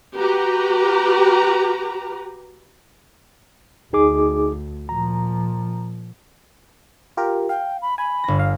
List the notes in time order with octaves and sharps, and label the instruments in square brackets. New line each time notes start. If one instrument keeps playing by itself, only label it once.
[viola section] F#4 G4 B4 A#5
[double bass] D2 [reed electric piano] D#4 G#4 D6
[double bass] A#2 F3 [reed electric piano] A#5
[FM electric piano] F4 G4 A#4
[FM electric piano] F5 [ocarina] G5
[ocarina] B5
[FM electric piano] G#5 [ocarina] B5
[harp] G1 A#6
[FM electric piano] F5